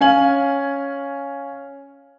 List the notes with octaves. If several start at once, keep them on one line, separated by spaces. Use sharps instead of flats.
C#4 F5 G#5 F#7